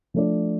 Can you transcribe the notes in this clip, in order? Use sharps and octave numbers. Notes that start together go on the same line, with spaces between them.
F3 A3 D4 A4 D5